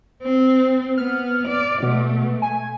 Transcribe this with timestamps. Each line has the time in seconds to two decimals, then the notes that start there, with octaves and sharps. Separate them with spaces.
0.23 C4
0.98 B3 F6
1.48 D5
1.83 B2 A3
2.42 G#5